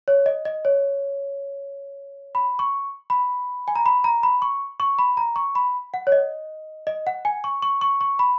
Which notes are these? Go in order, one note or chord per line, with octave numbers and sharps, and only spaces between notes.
C#5
D#5
D#5
C#5
B5
C#6
B5
G#5
A#5
B5
A#5
B5
C#6
C#6
B5
A#5
C#6
B5
F#5
C#5
D#5
D#5
F#5
G#5
C#6
C#6
C#6
C#6
B5